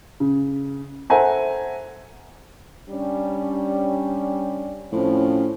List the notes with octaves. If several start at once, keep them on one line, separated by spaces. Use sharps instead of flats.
C#3
A4 C5 E5 F#5 G#5 A#5
G3 C#4 D4
A2 F3 C4 C#4